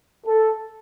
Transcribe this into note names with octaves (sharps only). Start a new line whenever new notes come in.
A4